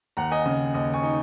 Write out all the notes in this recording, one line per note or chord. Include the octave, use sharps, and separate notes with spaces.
D#2 F#5 A#5
D#5 G#5
C#3 D#5
D#2 D#5
G#5 C#6
D#4